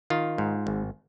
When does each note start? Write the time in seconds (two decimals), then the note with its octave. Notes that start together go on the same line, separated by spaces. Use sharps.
0.10 D#3 F4
0.38 G#2
0.67 G#1